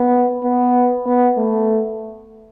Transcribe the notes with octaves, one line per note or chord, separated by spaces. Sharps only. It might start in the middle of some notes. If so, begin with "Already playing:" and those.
Already playing: B3
B3
B3
A3